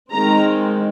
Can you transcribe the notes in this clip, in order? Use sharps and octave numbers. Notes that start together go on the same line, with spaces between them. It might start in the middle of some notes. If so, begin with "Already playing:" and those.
D#3 G#3 C4 A#5